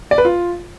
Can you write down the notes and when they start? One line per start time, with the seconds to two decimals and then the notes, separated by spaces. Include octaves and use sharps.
0.11 D5
0.18 B4
0.25 F4